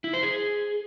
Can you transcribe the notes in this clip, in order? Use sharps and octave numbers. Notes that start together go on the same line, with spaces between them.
E4
C5
G#4